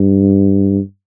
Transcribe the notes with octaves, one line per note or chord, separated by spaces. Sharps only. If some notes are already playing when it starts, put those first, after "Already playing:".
Already playing: G2